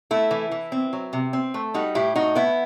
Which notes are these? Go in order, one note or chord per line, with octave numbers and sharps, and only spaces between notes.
A3 E4
E3
E3
C4
F#3
C3
C4
A3
G3 D#4 F#4
A2 E4 G4
A2 D#4 F#4
B3 E4